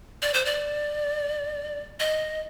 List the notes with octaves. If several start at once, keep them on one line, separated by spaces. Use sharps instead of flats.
D5
C5
D5
D#5